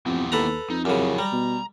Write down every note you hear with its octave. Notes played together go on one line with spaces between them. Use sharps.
F2 B3 E4 G4
D#2 A4 B4 A#5
F2 D#4
F#2 C#3 F#3 E4 G4
G3 A#5
B2